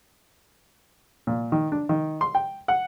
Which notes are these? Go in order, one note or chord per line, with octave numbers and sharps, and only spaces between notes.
A#2
D#3
D4
D#3
C6
G5
F#5